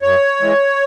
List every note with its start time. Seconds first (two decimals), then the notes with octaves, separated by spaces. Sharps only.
0.02 F#2 C#5
0.40 E3 G#3